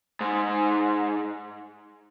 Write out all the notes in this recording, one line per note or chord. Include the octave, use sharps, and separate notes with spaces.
G#2